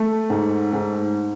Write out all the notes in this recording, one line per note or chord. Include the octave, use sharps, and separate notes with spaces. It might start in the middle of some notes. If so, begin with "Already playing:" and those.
Already playing: A3
G#2
G#2